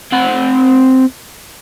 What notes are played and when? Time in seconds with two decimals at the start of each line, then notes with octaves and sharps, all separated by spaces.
0.12 C4 F#5